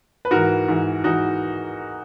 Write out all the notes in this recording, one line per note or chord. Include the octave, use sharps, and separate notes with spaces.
B4
G#2 E3 F#4 A#4
G#2 E3
G#2 E3 D#4 F#4